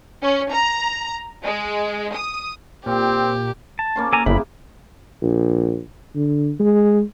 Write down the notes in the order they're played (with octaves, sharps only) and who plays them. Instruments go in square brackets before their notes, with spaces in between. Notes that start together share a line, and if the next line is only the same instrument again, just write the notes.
[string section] C#4
A#5
G#3
D#6
[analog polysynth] A#2 [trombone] C4 [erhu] G4
[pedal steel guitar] A5
[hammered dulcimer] A#3 C#4 C6
[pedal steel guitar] A4 G#5 A#5 [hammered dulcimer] D6
[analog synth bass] G1 [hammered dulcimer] C#3 E4 [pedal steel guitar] B5
[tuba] A#1
D3
G#3